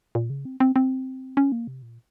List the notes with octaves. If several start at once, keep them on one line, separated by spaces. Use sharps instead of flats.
A#2
C#3
C4
C4
C4
C#4
A#3
C3
A#2